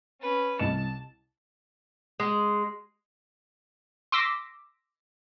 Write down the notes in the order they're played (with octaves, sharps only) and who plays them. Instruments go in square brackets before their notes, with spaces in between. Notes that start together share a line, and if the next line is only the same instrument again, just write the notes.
[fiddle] C#4 B4
[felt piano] C2 D#5 E7 [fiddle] A5
[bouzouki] G#3
[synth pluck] C6 D6 E6 A#6 B6